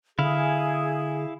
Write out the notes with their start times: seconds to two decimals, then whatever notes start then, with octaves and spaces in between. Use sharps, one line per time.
0.19 D3 E4 G#4 F5